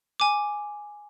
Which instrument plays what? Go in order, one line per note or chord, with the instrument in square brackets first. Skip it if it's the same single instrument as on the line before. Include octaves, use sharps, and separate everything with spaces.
[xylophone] G#5 D6